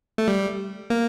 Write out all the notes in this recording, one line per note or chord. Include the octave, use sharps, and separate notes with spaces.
A3
G3
A#3